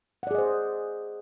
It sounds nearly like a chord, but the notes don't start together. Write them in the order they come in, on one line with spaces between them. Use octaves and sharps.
F#5 D5 G#4 D#5 C5